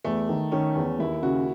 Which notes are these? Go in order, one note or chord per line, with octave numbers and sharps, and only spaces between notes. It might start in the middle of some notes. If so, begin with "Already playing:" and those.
E2 A3
D#3
D#3 C#4
E2
D#2 E4
C#3 F#4